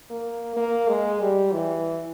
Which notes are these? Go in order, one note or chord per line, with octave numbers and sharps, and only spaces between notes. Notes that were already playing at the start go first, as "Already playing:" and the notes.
A#3
A#3
G#3
G3
E3